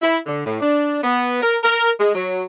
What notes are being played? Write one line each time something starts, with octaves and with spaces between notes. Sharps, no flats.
E4
D3
A2
D4
B3
A#4
A#4
G#3
F#3